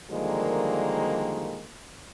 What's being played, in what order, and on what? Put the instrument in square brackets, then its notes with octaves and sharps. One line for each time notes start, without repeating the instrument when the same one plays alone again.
[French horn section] D3 D#3 F3 G3 G#3 A#3